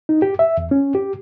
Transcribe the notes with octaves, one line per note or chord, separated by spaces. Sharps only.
D#4
G4
E5
E2
C#4
G4